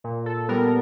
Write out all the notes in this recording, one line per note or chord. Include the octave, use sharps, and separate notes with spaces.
A#2
A4
G3 B3 A#4